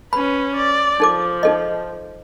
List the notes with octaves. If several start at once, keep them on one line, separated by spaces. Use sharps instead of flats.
C#4 B4 B5
D5
F3 D#4 A4 D6
D#4 A4 D#5